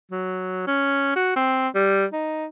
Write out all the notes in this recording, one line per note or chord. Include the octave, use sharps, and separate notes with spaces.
F#3
C#4
F#4
C4
G3
D#4